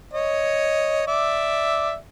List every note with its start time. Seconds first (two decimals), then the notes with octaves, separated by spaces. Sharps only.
0.14 C#5 D#5
1.07 D5 E5